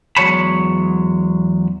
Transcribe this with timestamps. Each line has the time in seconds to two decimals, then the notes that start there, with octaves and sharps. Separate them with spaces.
0.17 E2 F#3 G#3 C#5 A5 B5